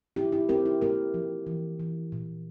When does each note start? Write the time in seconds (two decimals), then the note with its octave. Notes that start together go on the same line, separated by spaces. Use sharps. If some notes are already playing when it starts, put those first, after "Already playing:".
0.16 C4 E4 G4
0.32 E4 G4
0.49 C4 G4 A#4
0.65 E4
0.81 A#3 G4 A#4
1.14 F3
1.47 E3
1.80 E3
2.12 A#2